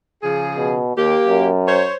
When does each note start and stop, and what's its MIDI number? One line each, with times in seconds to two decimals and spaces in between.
0.22 0.79 49
0.22 0.79 53
0.22 0.79 68
0.57 0.93 47
0.96 1.15 39
0.96 1.47 58
0.96 1.47 67
1.27 1.89 42
1.67 1.95 72
1.67 1.95 73